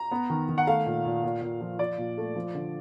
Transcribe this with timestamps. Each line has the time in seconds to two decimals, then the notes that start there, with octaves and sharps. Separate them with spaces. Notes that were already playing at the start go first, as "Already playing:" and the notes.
Already playing: A#5
0.12 B3
0.30 D#3
0.49 D#3
0.58 F#5
0.67 A3 F5
0.86 A#2
1.05 A#2
1.24 A#2
1.42 A#2
1.61 F3
1.79 F3 D5
1.98 A#2
2.18 A3
2.35 F3
2.54 D3